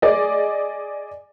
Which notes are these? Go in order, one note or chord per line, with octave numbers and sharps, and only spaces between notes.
G#4 D5 D#5